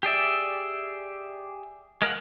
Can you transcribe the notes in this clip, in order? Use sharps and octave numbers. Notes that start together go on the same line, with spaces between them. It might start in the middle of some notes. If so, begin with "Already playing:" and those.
G4 G#4 D5 E5
G#3 A#4 F5 F#5